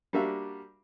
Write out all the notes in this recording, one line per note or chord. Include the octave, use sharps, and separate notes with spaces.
G3 A#3 D4 F#4 E5 F5